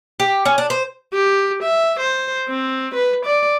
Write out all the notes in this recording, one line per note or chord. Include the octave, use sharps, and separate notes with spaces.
G4
C#4
D4
C5
G4
E5
C5
C4
B4
D5